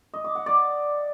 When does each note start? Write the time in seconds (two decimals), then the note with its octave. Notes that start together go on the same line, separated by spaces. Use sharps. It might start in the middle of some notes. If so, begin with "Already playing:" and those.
0.14 D#5
0.24 D6
0.35 F#5
0.46 D5